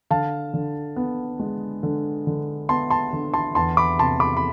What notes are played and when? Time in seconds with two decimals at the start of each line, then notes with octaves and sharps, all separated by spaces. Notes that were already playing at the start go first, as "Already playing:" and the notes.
0.10 D3 F5 A5
0.54 D3
0.96 B3
1.40 G#3
1.83 D3
2.27 D3
2.69 B3 A5 C6
2.90 A5 C6
3.13 D3
3.34 A5 C6
3.55 E2 A5 C6
3.77 B5 D6
3.99 C3 A5 C6
4.20 B5 D6
4.37 B5